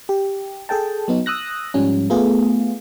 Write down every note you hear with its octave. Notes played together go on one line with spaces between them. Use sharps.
G4
G#4 A4 G5 A5
F#3 B3 D#4
D#6 E6 F#6 A#6
G#2 F3 G3 C#4
A3 B3 F4 G#4